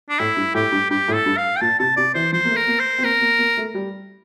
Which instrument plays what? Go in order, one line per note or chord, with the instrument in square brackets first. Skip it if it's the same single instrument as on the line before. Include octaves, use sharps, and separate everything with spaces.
[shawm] D4
[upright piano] A2 [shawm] E4
[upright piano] G2
[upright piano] A2 [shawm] G4
[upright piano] G2
[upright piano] G2 [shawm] G4
[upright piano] A2
[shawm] A4
[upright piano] G2
[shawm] F5
G5
[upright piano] A#2 [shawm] A5
[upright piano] C3 [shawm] A5
[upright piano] C3 [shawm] D5
[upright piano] E3 [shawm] C5
[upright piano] F3 [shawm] C5
[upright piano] A#3
A3
[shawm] A#4
[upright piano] A#3
[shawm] C5
[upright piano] C4
[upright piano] A#3 [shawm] A#4
[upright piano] A#3
A#3
A3
G3